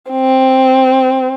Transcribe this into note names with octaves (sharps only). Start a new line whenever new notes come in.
C4